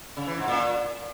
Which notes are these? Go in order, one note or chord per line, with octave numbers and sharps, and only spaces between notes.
C#3
E3
G#2
A#2